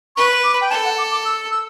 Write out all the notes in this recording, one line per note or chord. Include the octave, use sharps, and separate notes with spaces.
B4 C#6
D6
G5
A4 A5
F#5
D6
D6
E6
E6